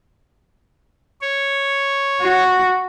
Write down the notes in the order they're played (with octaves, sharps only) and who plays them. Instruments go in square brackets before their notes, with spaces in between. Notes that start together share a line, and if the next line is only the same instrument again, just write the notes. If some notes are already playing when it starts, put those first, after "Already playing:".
[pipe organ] C#5
[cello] F#4